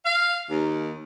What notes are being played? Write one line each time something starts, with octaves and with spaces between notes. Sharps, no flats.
F5
D#2